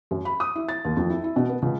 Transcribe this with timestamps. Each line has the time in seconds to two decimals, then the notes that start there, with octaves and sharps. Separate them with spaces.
0.11 F#2
0.25 B5
0.40 D#6
0.55 E4
0.69 A6
0.85 D#2
0.97 F2
1.10 E4
1.24 E4
1.36 B2
1.49 B3
1.62 C#2